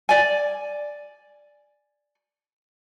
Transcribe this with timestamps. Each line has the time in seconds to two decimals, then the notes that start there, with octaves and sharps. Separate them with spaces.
0.09 D5 G#5